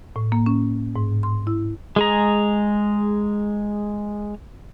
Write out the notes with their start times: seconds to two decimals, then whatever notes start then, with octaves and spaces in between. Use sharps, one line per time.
0.16 A2
0.32 A#3
0.46 C#4
0.96 G#2
1.23 C6
1.47 E4
1.96 G#3 G#4 A#5